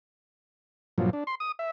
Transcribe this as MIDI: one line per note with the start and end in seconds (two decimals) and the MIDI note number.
0.98 1.10 43
0.98 1.10 46
0.98 1.10 53
0.98 1.10 54
1.13 1.24 62
1.27 1.35 84
1.40 1.52 87
1.59 1.71 76